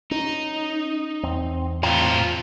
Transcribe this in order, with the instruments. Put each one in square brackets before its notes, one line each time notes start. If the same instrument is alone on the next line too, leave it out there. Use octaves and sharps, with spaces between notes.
[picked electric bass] C#4 [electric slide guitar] D#4
[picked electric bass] E2 [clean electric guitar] C4
[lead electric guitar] A2 C4 [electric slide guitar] F4 [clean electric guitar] C#5 G5 A#5